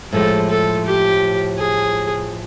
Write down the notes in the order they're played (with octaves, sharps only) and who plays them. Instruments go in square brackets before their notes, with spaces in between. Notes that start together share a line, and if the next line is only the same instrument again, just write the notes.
[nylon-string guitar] A2 F3 G#3 [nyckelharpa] A4
[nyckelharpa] A4
G4
G#4